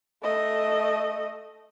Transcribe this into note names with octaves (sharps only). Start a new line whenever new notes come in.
A3 D#5